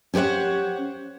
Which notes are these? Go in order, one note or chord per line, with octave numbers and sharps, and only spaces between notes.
C#4 G4 C5 C#5 F#5